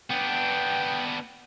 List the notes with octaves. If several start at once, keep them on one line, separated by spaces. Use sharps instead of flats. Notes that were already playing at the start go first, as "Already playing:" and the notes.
B3 D4 G5